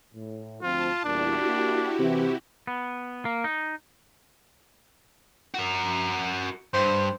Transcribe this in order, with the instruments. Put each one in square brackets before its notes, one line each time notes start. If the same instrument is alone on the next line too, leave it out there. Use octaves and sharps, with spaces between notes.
[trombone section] A2
[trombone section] D2 F3 C4 [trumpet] F4 [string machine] A5
[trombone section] E2 A#2 G3 [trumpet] D4 [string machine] E4 F#4 G4
[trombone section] A#3
[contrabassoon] C3 [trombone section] E3
[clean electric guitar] B3
A#3
D#4
[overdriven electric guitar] F#4 A#4
[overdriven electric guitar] G2 [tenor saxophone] C5